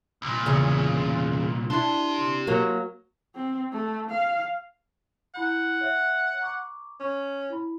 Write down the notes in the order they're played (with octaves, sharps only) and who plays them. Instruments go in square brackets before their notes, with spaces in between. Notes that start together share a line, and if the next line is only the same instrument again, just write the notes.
[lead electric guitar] C2 A#2
[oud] E2 C#3
[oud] D4 E4 [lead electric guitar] G4 C6
[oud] F#3 A#3
[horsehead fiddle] C4
A3
F5
[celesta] E4 B5 G6 [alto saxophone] F#5
[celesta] C#5 E5
A#5 C#6 D6
[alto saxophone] C#4 [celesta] C#6
[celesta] E4 B5